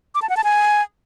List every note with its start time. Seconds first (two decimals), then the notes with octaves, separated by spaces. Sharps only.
0.15 D6
0.22 A5
0.29 F#5
0.37 A5
0.44 G#5